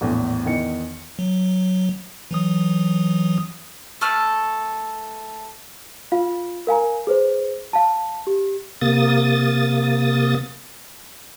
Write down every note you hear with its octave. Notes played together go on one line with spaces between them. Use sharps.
A#1 E2 A2
E2 D#3 D#5 C#7
F#3
E3 F#3 D#6
A3 A4 F6
F4 F5
A#4 F5 G#5 A#5
G#4 B4 C5
F5 A5
G4
C3 A#3 D#6 A6